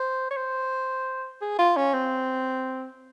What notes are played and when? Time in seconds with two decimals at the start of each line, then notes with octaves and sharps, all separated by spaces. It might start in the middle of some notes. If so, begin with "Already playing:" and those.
Already playing: C5
0.31 C#5
0.37 C5
1.42 G#4
1.59 F4
1.76 C#4
1.94 C4